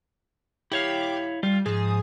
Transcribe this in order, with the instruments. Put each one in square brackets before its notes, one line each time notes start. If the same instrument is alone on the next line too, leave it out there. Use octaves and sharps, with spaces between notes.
[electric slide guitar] E4 C#5 F5 [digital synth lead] G4
[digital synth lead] G3 [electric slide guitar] F4
[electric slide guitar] G#2 F3 [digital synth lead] G#4